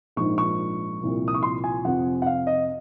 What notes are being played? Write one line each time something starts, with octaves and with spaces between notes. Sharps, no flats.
A#1 G#2 F3 C#6
C#6
C2 A#2 F3
D#6
C#6
C6
G#5
F2 C3 F3 F#5
F#5
F5
D#5